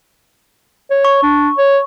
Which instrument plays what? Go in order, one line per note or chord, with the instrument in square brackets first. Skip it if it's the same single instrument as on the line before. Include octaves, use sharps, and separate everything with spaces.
[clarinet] C#5
[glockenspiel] C#6
[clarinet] D4
C#5